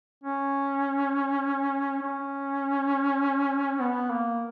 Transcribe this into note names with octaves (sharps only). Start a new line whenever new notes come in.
C#4
C#4
B3
A#3